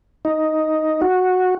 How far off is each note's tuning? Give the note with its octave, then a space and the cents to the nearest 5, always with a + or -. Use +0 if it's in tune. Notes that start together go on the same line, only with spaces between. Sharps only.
D#4 +5
F#4 -10